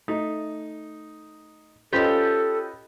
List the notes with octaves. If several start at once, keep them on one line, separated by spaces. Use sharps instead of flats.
A3 D#4
C#4 F4 G4 A4 B4 C5 D#5